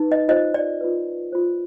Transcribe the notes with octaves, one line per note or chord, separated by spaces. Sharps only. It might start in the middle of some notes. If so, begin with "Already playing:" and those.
Already playing: D#4 B4
D#5
F4 C5 D#5
D5
F4 B4
F4 C5